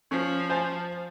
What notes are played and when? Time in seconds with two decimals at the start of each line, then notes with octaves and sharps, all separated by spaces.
0.11 F3 C#4
0.50 C5 G#5 A5